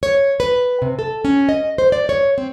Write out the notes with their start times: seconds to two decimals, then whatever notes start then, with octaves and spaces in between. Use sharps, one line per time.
0.03 C#5
0.40 B4
0.82 C3
0.99 A4
1.25 C#4
1.49 D#5
1.78 C5
1.92 D5
2.09 C#5
2.38 C4